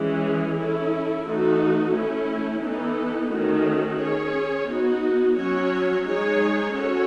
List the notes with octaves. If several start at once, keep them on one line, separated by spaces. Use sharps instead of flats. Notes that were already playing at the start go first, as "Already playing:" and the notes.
Already playing: E3 G#3 C#4 G#4
C#4 E4 A4
E3 A3 D#4 F#4 A4
A3 C#4 E4
E3 B3 D#4 A4
D#3 A3 C#4 F#4
C#4 G#4 C#5
B3 D#4 F#4
F#3 C#4 F#4 C#5
G#3 D#4 G#4 C#5
C#4 F#4 A4 C#5